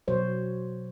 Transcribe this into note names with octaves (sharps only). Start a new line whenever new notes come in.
B2 F#3 C5 C#5